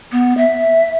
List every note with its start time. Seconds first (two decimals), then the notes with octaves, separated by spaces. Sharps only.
0.12 B3
0.37 E5